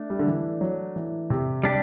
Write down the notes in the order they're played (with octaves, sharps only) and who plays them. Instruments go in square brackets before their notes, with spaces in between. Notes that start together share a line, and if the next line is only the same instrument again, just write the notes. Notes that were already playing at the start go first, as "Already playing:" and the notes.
Already playing: [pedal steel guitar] A3 D4
[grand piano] G3
D3
E3
F#3
E3
C3
[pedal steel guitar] G3 D4 G4